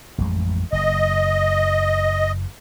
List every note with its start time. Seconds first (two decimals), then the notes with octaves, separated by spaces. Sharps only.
0.18 A1 F2 G#3
0.72 F#1 D#5